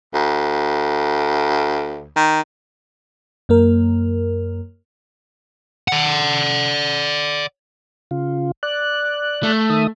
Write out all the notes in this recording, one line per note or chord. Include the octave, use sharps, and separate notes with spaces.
D2
D#3
F#2 A#3 A#4
D5 F#5
C#3 F4
D5 F#6
A3
D#3 E5 D#6